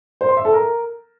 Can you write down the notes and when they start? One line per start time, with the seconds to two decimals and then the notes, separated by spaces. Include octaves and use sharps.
0.21 C5
0.29 C6
0.37 E5
0.45 A4
0.53 A#4